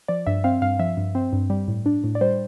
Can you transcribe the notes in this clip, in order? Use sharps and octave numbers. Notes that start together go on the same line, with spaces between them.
F3 D5
G2 E5
C4 F5
G2 F5
F3 E5
G2
C4
G2
G3
A2
D4
A2
D5
G3 C5